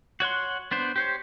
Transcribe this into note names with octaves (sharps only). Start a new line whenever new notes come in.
F#4 C#5 F#5 C6
B3 D4 C5
G4 C5 C#5